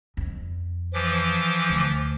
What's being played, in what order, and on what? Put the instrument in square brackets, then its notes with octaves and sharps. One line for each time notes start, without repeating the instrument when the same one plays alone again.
[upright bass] F2
[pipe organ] E3 F3 D6
[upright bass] D2